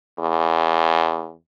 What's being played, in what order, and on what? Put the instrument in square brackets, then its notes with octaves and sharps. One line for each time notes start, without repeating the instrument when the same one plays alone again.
[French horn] E2